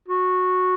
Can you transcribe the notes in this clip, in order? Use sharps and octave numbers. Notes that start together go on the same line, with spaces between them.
F#4